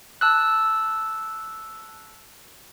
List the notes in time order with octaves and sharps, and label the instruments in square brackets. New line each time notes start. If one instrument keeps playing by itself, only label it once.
[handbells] A5 E6 F#6